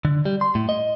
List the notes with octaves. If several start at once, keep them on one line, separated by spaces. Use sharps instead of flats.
D3
G3
C6
A2
D#5